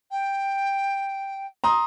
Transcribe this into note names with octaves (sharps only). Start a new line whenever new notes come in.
G5
A#5 C6 D#6